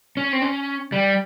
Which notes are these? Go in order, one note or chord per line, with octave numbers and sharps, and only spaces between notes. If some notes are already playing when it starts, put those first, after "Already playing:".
C#4
C4
C#4
G3